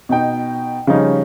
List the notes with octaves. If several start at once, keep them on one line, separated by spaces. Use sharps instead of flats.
B2 D#4 G5
C#3 F3 G3 C#4 D#4